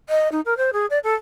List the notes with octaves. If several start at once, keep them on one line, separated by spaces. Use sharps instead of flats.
D#5
D#4
A#4
C5
G#4
D5
A4